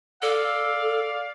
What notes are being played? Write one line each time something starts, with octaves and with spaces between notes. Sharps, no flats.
A4 D5 F5